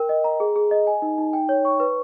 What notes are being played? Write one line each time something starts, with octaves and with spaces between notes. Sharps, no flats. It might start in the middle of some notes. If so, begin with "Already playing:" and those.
Already playing: A#4 G5
D#5
A#5
G#4
G#4
D#5
G#5
D#4
D#4
G5
C#5
C#6
B4